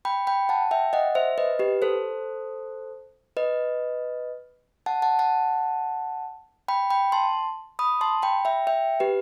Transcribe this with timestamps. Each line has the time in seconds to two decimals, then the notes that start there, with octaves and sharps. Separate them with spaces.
0.05 G5 B5
0.27 G5 B5
0.49 F#5 A5
0.71 E5 G5
0.93 D#5 F#5
1.15 C5 E5
1.38 B4 D#5
1.59 G4 B4
1.82 A4 C5
3.37 B4 D#5
4.86 F#5 A5
5.02 F#5 A5
5.19 F#5 A5
6.68 G5 B5
6.90 G5 B5
7.12 A5 C6
7.79 B5 D#6
8.01 A5 C6
8.23 G5 B5
8.45 E5 G5
8.67 E5 G5
9.00 G4 B4